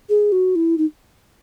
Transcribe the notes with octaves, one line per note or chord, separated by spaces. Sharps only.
G#4
F#4
E4
D#4